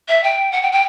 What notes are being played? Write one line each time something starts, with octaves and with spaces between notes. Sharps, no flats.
E5
G5
F#5
G5
G5